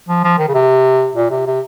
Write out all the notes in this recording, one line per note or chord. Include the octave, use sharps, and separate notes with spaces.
F3
F3
D#3
C#3
C3
A#2
C3
C3